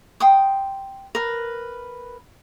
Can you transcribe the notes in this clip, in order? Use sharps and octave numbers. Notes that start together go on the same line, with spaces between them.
G5 C6 D#6
A#4 B4